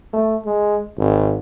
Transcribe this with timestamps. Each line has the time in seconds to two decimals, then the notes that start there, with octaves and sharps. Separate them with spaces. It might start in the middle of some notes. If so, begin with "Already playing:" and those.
0.13 A3
0.46 G#3
0.97 G#1